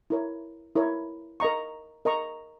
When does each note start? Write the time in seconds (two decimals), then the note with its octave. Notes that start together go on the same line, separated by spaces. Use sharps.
0.10 E4 A#4 C#5
0.75 E4 A#4 C#5
1.40 A#4 D#5 A#5 C#6
2.05 A#4 D#5 A#5 C#6